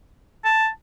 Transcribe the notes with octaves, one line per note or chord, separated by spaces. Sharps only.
A5